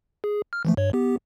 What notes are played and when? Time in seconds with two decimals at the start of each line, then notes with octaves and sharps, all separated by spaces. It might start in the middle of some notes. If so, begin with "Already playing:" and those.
0.24 G#4
0.53 F6
0.65 E3 F3 A3
0.77 G2 C#5
0.93 B3 G4